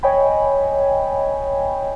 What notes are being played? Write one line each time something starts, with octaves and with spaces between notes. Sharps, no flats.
C#5 D#5 G5 G#5 B5